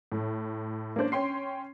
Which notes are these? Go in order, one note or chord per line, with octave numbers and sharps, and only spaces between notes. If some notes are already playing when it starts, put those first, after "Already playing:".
A2
A#3 C#4 D4 C5
C#4 G5 C6 C7